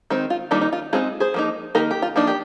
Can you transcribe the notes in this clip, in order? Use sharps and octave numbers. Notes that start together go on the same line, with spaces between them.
D#3 G#3 C4
F4
D#3 G3 A#3 D4 D#4
D#4
F4
G#3 C4 D#4 F4 G#4
G#4 C5
F3 A#3 D#4
D#3 A#3 D#4 G4 A#4
G4
F4
F3 A#3 D4 D#4
G4